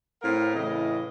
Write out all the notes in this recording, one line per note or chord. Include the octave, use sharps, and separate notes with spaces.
A2 C4 A#4 F5
A2 C#3 E3 D#5